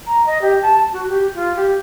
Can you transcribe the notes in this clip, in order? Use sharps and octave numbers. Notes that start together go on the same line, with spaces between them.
A#5
D#5
G4
A5
F#4
G4
F4
G4